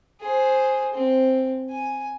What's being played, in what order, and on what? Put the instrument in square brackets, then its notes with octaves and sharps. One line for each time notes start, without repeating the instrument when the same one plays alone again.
[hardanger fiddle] G#4 C5
C4
G#5